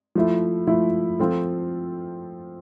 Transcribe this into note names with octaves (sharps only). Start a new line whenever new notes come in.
F3 A3 E4
F3 A3 E4
F3 C4 F4 A4